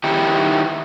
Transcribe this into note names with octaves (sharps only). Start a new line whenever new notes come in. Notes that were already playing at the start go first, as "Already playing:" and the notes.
D#3 D#4 E4 G4